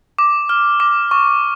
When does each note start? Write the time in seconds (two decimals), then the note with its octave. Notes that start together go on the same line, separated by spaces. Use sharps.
0.19 D6
0.49 F6
0.80 D6
1.11 C#6